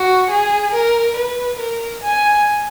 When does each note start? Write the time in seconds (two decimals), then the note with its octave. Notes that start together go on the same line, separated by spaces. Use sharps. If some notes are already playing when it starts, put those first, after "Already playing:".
Already playing: F#4
0.30 G#4
0.73 A#4
1.16 B4
1.59 A#4
2.03 G#5